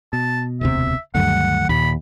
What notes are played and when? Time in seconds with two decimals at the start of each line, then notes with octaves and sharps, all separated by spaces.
0.13 B2 A5
0.61 E1 D2 C3 E5
1.15 D2 G2 D#3 F#3 A3 F#5
1.69 D#2 A#2 B5